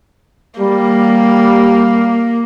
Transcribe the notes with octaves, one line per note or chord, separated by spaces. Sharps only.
G3 A#3